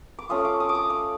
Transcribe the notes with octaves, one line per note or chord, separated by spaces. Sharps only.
D6
A3 C#4 F4 D#6
D6
D#6
D6
D#6
D6